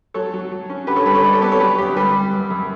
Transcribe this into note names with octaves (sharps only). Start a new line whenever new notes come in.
F#3 A4 C#5
F#3
F#3
C#4
D3 G4 B4
A4 C#5
G3 G4 B4
A4 C#5
G3 B4 D5
A4 C#5
B3 G4 B4
A4 C#5
F#3 G4 B4
D2 G4
G3 G4 B4
G3
F#2
F#2